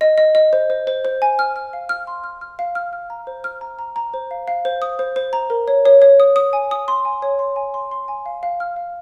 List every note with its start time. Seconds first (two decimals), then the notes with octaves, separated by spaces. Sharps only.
0.01 D#5
0.18 D#5
0.35 D#5
0.53 C5
0.70 C5
0.87 C5
1.05 C5
1.22 G#5
1.39 F6
1.56 F6
1.73 F5
1.89 F6
2.07 C6
2.24 F6
2.41 F6
2.59 F5
2.75 F6
2.93 F6
3.10 A#5
3.27 C5
3.44 F6
3.61 A#5
3.79 A#5
3.96 A#5
4.14 C5
4.31 F5
4.48 F5
4.65 C5
4.82 D#6
4.99 C5
5.16 C5
5.33 A#5
5.50 A#4
5.68 C#5
5.86 C#5
6.02 C#5
6.20 D#6
6.36 D#6
6.53 G#5
6.71 D#6
6.88 C6
7.05 G#5
7.22 C#5
7.39 C6
7.56 G#5
7.74 C6
7.91 C6
8.08 G#5
8.26 F5
8.43 F5
8.60 F6
8.76 F5